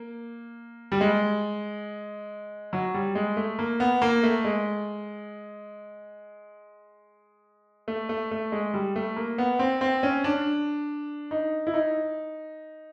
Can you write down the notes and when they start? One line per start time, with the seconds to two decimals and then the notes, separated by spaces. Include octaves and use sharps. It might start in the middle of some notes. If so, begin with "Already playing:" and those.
Already playing: A#3
0.92 G3
1.01 G#3
2.73 F#3
2.94 G3
3.15 G#3
3.37 A3
3.59 A#3
3.80 B3
4.02 A#3
4.23 A3
4.44 G#3
7.88 A3
8.09 A3
8.31 A3
8.52 G#3
8.74 G3
8.96 A3
9.16 A#3
9.38 B3
9.59 C4
9.81 C4
10.03 C#4
10.24 D4
11.31 D#4
11.67 E4
11.74 D#4